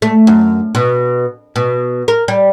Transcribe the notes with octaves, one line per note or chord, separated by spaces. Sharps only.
A3
F#2
B2
B2
A#4
G3